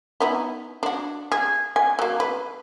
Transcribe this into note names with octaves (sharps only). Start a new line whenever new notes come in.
B3 D#4 E4
D4 F#4
G#4
G#5
F#3 A#3
B4